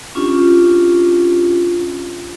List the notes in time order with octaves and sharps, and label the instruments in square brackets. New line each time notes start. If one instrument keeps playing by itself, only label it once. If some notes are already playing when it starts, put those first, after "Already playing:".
[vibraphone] C#4 D4 F4 G4